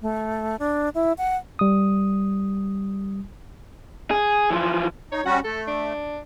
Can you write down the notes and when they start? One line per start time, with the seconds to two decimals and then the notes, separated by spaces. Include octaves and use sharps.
0.02 A3
0.59 D4
0.95 E4
1.18 F#5
1.59 G3 D#6
4.11 G#4
4.51 E3 F3
5.12 D#4 C#5
5.25 G3 C#4 F#4 F#5
5.44 A3 A4
5.67 D4